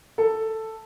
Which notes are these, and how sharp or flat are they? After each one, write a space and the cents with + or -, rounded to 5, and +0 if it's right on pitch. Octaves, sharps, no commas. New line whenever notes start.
A4 +5